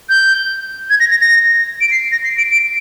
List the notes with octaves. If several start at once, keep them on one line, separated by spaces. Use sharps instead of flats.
G6
G#6
A#6
A#6
A#6
D7
C7
A#6
C7
D7
D7